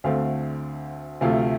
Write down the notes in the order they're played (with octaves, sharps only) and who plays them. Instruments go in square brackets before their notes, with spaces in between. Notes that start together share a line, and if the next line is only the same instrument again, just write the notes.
[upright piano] D2 D3 A3 C4 F5
D2 C3 F3 A3 F5